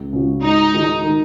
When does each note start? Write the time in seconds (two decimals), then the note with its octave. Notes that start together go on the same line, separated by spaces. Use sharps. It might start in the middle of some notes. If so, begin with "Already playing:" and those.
Already playing: C#2
0.13 C#3 G#3 F#4
0.42 G#2 D#4
0.73 D#3 G#3 F#4
1.03 D#3